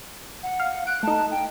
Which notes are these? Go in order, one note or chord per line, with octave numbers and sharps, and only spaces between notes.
F#5
F5
F#6 D7
A3 D#4 A5
G5